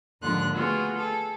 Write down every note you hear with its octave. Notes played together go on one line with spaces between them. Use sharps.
D#2 G#2 D3 F3 F4 F#6
A3 B3 F4 F#4 G#4
G#4 A4